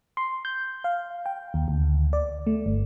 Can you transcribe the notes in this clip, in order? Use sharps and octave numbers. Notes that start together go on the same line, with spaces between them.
C6
G6
F5
G5
D#2
D2
D5
A3
G1